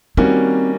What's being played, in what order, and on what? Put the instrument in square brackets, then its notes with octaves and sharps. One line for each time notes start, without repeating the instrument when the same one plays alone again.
[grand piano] D#3 G3 A#3 C#4 F#4 [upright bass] C4